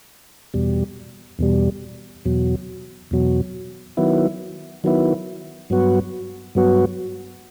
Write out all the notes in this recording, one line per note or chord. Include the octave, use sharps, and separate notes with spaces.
E2 B2 G3
E2 B2 G3
E2 B2 F#3
E2 B2 F#3
D#3 F#3 B3 E4
D#3 F#3 B3 E4
G2 F#3 B3 F#4
G2 F#3 B3 F#4